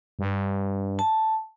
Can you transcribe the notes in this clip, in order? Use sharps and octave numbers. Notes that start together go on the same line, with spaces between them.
G2
A5